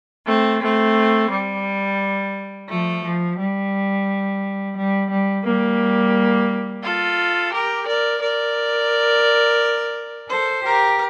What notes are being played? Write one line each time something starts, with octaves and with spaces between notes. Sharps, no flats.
A3 C4
A3 C4
G3
F3 A3
F3
G3
G3
G3
G3 A#3
F4 A4
G4 A#4
A#4 D5
A#4 D5
A4 C5
G4 A#4